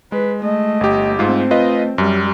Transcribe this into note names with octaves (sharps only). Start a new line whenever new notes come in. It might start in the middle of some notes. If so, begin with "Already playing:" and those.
G#3 B4
A3 D#5
G1 G4
G#2 A3 C4 F4
F4 B4 D#5
F#2 G3